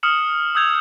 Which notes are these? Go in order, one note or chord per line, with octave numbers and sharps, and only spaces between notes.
D#6 F6 C#7 E7 F#7
D#6 E6 G6 G#6 F7